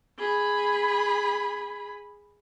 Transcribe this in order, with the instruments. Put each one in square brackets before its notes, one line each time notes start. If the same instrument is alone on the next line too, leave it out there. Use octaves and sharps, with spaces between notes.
[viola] G#4 B5